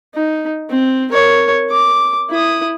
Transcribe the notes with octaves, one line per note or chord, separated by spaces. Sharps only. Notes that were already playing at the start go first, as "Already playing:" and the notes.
D#4
C4
A#4 C#5
D6
E4 D#6